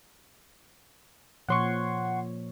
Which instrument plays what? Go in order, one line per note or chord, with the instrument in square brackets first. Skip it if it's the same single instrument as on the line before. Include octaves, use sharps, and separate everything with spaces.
[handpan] A#2 F3 C#5 [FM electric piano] F#5 C6 C#6